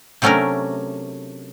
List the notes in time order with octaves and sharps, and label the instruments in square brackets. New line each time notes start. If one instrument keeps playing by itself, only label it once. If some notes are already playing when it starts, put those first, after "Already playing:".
[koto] C3 F#3 A3 C#4 D4 A#4